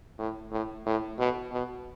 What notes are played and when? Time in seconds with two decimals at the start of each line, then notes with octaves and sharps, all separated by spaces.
0.19 A2
0.52 A2
0.86 A2
1.19 B2
1.52 B2